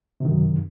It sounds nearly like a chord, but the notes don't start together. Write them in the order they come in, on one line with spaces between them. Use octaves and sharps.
C3 D#3 F#2